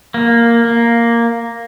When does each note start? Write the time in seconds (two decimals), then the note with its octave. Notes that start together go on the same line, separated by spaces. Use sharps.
0.14 A#3
0.65 A#3